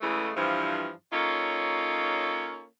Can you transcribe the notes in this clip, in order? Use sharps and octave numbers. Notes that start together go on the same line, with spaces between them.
C#3 E3 G#3 A3
G2 E3 F3
A#3 C#4 D#4 F4 A4 C#5